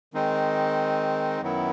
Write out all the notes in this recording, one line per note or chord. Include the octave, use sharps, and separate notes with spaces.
D#3 G#3 C4 D#4
F#2 D#3 F#3 B3 E4